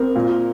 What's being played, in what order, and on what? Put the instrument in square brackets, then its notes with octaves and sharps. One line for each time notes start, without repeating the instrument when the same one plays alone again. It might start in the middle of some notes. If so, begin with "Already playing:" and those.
Already playing: [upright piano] C4 [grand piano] A#4
[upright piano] A#2